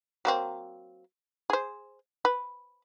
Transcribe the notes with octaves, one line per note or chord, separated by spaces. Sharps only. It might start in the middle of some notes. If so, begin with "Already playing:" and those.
F#3 A#3 C4
G#4 C5
B4